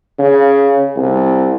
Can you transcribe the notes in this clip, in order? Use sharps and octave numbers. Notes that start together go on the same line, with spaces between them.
C#3
C2